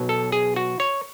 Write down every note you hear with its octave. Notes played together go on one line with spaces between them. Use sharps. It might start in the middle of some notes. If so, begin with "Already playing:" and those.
Already playing: B1 B2 F#3
A4
G#4
F#4
C#5